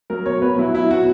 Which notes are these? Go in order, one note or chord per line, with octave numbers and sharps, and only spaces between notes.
F#3 A#4
B2 C#5
B2 B4
F#3 E4
B2 E4
B2 F#4